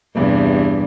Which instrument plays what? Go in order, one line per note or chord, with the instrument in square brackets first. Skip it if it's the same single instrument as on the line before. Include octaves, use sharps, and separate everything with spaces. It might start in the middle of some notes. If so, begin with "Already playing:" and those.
[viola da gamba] E2 G2 C3